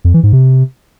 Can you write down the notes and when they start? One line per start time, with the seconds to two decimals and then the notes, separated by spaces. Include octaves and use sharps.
0.04 F2
0.14 E3
0.23 G#2
0.33 C3